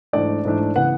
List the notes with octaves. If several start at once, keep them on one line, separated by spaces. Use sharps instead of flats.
G#2 E3 A3 D4 D5
G#2 E3 A3 D4
C#3 E3 B3 F#5